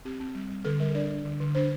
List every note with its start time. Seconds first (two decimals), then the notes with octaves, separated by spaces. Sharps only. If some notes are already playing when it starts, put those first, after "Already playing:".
0.05 C4 G4
0.20 C4
0.35 G3
0.50 G3
0.65 D3 A4
0.80 G3 A#4
0.95 D4 D5
1.10 D4
1.25 D3
1.40 D3
1.55 D4 C5